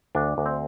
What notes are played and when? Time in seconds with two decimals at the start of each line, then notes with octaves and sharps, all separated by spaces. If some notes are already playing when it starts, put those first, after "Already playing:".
0.15 D2 D4
0.38 D2
0.46 C4